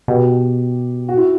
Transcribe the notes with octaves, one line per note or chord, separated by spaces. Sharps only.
B2 G4
F#4
E4